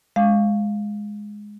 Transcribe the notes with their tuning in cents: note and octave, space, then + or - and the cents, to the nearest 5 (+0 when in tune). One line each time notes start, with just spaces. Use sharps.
G#3 +0 F5 +0